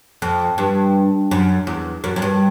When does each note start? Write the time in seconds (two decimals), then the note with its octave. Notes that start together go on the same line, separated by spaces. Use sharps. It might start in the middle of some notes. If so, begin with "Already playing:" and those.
0.22 F2
0.58 G2
1.31 F#2
1.67 E2
2.04 F#2
2.16 F#2
2.22 G2